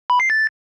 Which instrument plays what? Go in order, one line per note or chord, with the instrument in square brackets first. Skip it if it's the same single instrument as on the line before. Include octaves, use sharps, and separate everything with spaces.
[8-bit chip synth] B5
C7
A6